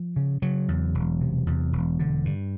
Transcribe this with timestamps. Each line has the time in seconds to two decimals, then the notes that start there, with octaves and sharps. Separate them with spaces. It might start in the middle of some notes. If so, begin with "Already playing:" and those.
Already playing: F3
0.16 C#3
0.42 C#3 F#3
0.68 E2
0.95 E1
1.21 C3
1.47 E2
1.73 E1
1.99 D3
2.25 G2